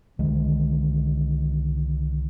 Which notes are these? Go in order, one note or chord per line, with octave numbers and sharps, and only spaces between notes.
C2 D3 D#3 G#3